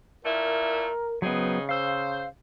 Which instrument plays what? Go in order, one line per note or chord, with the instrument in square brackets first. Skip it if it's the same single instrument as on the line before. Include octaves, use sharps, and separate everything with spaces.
[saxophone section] A#2 A3 E4 [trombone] A#4
[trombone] C#3 [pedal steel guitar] F#3 B3 [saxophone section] C4 D#4 G#4
[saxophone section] C5 [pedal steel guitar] F5 E6